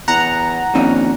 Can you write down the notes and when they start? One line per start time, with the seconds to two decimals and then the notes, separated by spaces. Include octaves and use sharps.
0.08 E2 F#5 A#5
0.75 A#1 D#3 C4 C#4